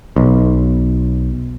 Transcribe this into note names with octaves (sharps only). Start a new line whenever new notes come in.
B1